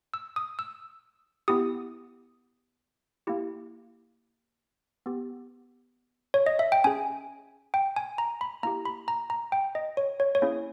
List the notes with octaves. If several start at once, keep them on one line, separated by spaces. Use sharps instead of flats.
E6
D#6
E6
B3 E4 G4 D#6
A#3 E4 G4
B3 G4
C#5
D#5
E5
G5
C#4 G#4 G#5
G5
G#5
A#5
B5
A#3 E4 G4 A#5
B5
A#5
A#5
G5
D#5
C#5
C#5
C#5
A#3 C#4 E4 G#4